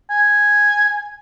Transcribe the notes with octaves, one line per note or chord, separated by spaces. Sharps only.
G#5